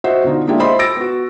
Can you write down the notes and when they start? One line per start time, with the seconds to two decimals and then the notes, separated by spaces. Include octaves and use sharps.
0.04 F#4 C5 D#5 E5 F#5
0.24 B2 D3 D#4 F4
0.47 G#3 A#3 D4 E4 F4 G4
0.60 C5 D#5 E5 B5 C6
0.79 E6 A6 A#6 D7
0.96 B3 F#4